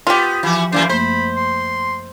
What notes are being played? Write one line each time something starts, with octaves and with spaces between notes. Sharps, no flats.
B3 F4 G4
E3 F3 F#4 B5 D6
F#2 E3 A#3 C5
F#2 A3 A#3 C5 B5
C6